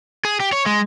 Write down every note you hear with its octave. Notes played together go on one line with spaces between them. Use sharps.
G#4
G4
C#5
G#3